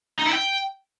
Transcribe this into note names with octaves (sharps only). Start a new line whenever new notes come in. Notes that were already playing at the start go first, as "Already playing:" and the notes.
D#4
E4
G5